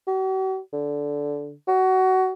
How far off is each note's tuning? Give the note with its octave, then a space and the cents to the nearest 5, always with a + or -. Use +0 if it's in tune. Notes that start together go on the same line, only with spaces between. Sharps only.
F#4 +45
D3 -15
F#4 +20